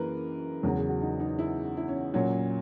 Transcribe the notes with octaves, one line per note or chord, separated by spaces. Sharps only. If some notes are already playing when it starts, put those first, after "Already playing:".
Already playing: F#2 E3 G#3 A#3 A#4 B4
E2 C#3 F#3 A#4
G#4
F#4
D#4
D#4
E4
E4
C#4
A#2 F#3 C#4